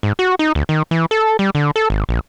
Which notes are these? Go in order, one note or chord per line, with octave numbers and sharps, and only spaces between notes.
G#2
F#4
D#4
D2
D#3
E3
A4
G3
D3
A4
G#1
A#1